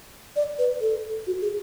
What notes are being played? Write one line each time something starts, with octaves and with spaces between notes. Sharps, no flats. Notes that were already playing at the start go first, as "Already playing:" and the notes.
D5
B4
A4
F#4
G#4